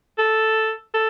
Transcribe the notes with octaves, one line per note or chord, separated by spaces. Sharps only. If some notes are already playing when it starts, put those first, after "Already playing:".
A4
A4